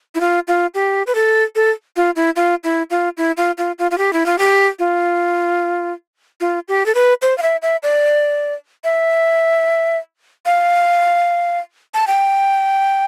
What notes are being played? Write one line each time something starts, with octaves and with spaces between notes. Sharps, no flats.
E4
F4
F4
G4
B4
A4
A4
F4
E4
F4
E4
F4
E4
F4
F4
F4
F4
G4
E4
F4
G4
F4
F4
G4
A4
B4
C5
F5
E5
E5
D5
E5
F5
A5
G5